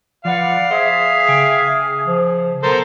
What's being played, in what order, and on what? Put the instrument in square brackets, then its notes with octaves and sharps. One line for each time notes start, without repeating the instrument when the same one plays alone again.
[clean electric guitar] F3 B4 [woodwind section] D5 F#5 [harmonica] F5
[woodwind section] G#4 [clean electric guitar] C5 [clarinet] E5
[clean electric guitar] C#3 G5 G#5
[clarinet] F3
[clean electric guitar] B1 B3 [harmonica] A4 A#4 C5